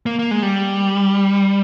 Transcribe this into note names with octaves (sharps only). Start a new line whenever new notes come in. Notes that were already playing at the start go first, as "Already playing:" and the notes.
A#3
A#3
G#3
G3